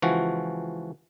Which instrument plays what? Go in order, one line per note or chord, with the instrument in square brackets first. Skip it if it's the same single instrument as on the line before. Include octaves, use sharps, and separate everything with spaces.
[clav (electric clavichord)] C#2 E3 F3 F#4